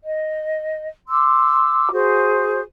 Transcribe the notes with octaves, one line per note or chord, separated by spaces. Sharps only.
D#5
C6 D6 E6
F#4 G#4 C5